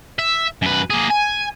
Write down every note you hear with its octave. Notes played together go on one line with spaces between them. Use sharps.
E5
F#2 B4
A#3 G#4
G#5